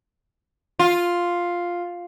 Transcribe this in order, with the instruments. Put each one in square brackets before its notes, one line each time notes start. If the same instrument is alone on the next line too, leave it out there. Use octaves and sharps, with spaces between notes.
[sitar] F4